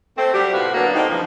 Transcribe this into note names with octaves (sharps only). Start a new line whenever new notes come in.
A3 C4
F#3 G3 G4
A2 C3 B3 F4 F#4
D3 F#3 A#3 B3 D4
A2 C4 D#4
G2 C#3 E3 F3